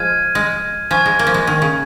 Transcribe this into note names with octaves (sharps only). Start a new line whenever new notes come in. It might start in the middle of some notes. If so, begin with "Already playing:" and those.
Already playing: F3 G#3 F6 G#6 D#7
G#3
F3 G#5 C#6 G#6
G#3
A#3
F3
G#3
D#3
C#3